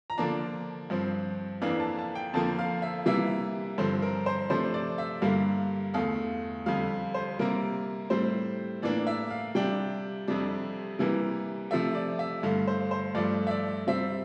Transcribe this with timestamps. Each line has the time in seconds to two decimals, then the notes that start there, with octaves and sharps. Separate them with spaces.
0.10 A#5
0.18 D3 F3 A#3 D4 A5
0.90 G2 F3 C4
1.62 F2 E3 A#3 D4 F5
1.80 A5
1.99 A5
2.15 G5
2.33 F2 D3 F3 A#3 A5
2.59 F5
2.82 E5
3.06 C3 E3 G3 A#3 E5
3.78 G2 D3 F3 C4 C5
4.02 A#4
4.26 C5
4.50 C3 F3 A3 D4 C5
4.74 D5
4.98 E5
5.22 G2 D3 G3 A#3 F5
5.94 E2 D3 A3 F5
6.66 F2 D3 G3 F5
7.14 C5
7.39 C3 G3 A#3 A#4
8.10 A2 G3 C4 C5
8.82 A2 E3 A#3 D4 D5
9.07 E5
9.30 F5
9.55 C3 G3 D4 G5
10.28 F2 C3 G3 D4
10.99 C3 E3 G3 A#3
11.71 C3 F3 A3 E5
11.95 D5
12.19 E5
12.43 G2 D3 A3 F5
12.68 C5
12.91 C5
13.15 G2 F3 A3 D5
13.47 E5
13.51 D5
13.87 C3 G3 C4 E5